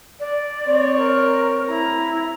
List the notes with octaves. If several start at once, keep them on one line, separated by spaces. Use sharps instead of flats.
D5
C4 C#5
A#4
E4 A#5